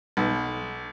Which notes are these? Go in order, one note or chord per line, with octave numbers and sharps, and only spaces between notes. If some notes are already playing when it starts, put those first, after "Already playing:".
B1